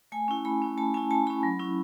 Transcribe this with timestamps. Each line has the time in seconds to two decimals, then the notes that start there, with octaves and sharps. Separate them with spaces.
0.12 A3 G#5
0.28 C#4 E4
0.45 A3 B5
0.62 C#4 E4
0.78 A3 A5
0.94 C#4 E4 G#5
1.11 A3 A5
1.27 C#4 E4 B5
1.43 F#3
1.59 C#4 E4